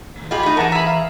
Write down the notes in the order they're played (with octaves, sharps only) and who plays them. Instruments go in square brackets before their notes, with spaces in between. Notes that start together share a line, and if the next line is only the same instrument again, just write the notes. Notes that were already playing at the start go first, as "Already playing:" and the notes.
[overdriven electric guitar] A#2 D#3
[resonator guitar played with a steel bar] F4 G4 G#4 [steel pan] D#5 [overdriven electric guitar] B5
[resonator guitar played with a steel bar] A3 D#4
[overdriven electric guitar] E3 [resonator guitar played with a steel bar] G#4 A#4 [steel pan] F#5 A5 A#5
[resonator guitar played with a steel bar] G#4 E5 [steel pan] A#5 B5
[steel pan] F5